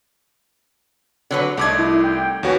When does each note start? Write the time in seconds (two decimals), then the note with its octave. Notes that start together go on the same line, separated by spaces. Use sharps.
1.31 D3 F#3 B4
1.57 C2 A3 D#4 D6 G#6
1.78 E4
2.04 G5
2.43 D#2 C#4 F#4 B4